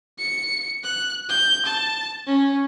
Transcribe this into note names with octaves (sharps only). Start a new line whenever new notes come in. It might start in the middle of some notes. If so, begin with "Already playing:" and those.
C#7
F#6
G6
A5
C#4